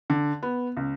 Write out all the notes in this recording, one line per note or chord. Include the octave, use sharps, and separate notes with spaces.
D3
B3
C#2